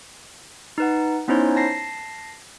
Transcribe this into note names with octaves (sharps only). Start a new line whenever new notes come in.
D#4 B4 F#5
B3 C#4 D#4 E4 C5 C#5
A5 A#6 C7